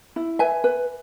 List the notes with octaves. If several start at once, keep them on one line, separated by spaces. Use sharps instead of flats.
E4
B4 E5 G#5
B4